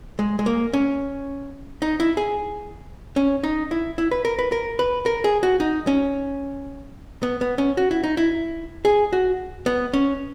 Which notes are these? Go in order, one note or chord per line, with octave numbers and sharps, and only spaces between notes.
G#3
G#3
A#3
C#4
D#4
E4
G#4
C#4
D#4
E4
E4
B4
A#4
B4
A#4
B4
A#4
G#4
F#4
D#4
C#4
B3
B3
C#4
F#4
E4
D#4
E4
G#4
F#4
B3
C#4